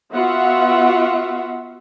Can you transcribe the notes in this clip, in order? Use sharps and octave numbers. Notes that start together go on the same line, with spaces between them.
B3 F4 F#4 E5 F#5